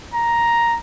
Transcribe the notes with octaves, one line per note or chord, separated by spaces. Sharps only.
A#5